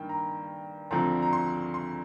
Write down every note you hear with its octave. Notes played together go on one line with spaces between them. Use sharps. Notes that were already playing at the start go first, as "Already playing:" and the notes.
Already playing: G2 D#3 A#3 G5
A#5
D2 D3 F3 C4 A#5
A#5
C6
C6